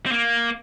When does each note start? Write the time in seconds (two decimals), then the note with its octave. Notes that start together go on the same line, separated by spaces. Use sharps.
0.06 C4
0.12 A#3